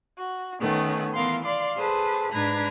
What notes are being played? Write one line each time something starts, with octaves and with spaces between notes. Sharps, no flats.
F#4
D#3 A3 B3 C#4
E3 B3 A#4 F5 C6
D5 F5 C6 D6
G#4 A4 B4 C5
G#2 D4 B4 A#5 G#6